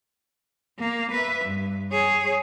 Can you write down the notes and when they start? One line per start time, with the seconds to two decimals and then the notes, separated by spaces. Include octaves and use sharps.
0.79 A#3
1.12 B4 E5
1.46 G2
1.92 G#4 C#5